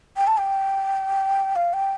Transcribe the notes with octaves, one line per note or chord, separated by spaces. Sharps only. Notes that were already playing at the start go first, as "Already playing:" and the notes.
G5
A5
G5
F5
G5